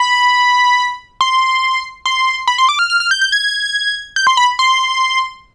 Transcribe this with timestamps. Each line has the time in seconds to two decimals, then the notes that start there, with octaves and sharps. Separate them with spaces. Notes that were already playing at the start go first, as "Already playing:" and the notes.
Already playing: B5
1.21 C6
2.06 C6
2.47 B5
2.58 C6
2.69 D6
2.79 F6
2.90 F6
3.00 F6
3.11 G6
3.21 G6
3.32 G#6
4.16 G6
4.27 C6
4.37 B5
4.59 C6